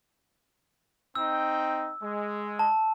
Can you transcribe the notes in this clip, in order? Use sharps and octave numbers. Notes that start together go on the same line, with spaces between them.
C4 D#4 G5 E6
G#3
A5